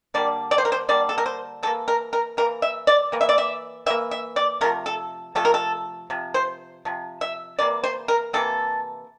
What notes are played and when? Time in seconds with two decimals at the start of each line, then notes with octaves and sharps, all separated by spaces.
0.14 D3 G3 A#3 D5
0.51 D5
0.58 C5
0.65 A#4
0.72 C5
0.89 D3 G3 A#3 D5
1.09 A4
1.18 A#4
1.26 C5
1.63 E3 A4
1.67 A#3
1.88 A#4
2.13 A#4
2.37 E3 A#3 A#4
2.62 E5
2.87 D5
3.12 E3 A#3
3.21 E5
3.29 D5
3.38 E5
3.86 E3 E5
3.90 A#3
4.11 E5
4.36 D5
4.61 C3 F3 A3 A#4
4.86 A4
5.35 C3 F3 A3 A4
5.45 A#4
5.54 A4
6.10 C3 F3
6.34 C5
6.85 C3 F3
7.21 E5
7.59 C3 E3 A#3 D5
7.84 C5
8.08 A#4
8.33 C3 E3 G3 A#3 A4